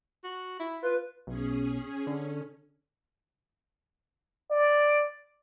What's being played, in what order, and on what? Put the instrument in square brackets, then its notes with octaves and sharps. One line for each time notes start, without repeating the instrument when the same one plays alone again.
[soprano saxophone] F#4
E4
[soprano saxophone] F4 [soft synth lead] B4
[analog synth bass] B1 [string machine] C#4 G#4
[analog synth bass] D3 [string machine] C#4
[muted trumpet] D5